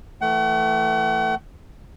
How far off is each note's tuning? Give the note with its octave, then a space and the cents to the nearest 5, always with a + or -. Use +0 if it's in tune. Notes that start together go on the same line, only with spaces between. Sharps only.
E3 +0 A3 +15 F#5 +40